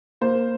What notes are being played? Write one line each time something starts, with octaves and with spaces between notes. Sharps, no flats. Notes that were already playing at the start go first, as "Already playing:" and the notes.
A#3 C5